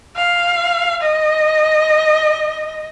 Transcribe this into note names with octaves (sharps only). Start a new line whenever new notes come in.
F5
D#5